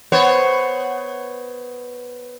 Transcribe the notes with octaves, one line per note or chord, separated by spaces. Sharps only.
B3 C5 C#5